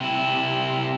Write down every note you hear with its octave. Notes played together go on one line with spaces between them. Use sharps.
C3 E4